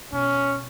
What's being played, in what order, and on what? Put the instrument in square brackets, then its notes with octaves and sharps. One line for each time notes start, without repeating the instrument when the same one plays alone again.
[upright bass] B2 [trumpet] C#4